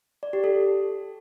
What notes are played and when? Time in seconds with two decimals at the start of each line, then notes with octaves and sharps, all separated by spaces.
0.23 D5
0.33 G4
0.44 A4